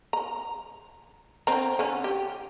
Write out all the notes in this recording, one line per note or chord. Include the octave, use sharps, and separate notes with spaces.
A#5
D3 C4 A#5
D3 C#4
G4